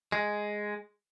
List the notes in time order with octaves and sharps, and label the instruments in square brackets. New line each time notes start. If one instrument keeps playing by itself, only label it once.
[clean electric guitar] G#3